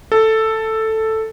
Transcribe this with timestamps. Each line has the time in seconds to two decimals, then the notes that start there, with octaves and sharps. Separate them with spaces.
0.12 A4